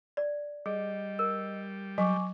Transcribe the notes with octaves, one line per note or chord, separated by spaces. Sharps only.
D5
G3 G#4 D#5
A#4
F#3 G#5 C#6 D6